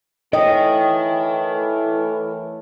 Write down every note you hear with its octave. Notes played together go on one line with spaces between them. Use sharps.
E3 A3 A#4 C#5 D#5 G5